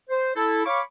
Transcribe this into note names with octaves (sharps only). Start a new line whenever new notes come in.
C5
E4 A4
C#5 F5 B5 C#6 D6